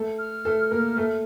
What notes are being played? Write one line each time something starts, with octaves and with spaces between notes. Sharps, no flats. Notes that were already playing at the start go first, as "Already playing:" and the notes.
Already playing: A3 A4
F6
A3 A4
A#3 A#4
A3 A4